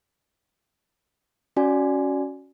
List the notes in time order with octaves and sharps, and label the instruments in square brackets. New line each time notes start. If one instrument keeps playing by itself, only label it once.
[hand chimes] C#4 F#4 D5 G#5